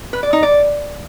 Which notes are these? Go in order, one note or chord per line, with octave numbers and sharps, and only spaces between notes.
B4
D5
D#4
D5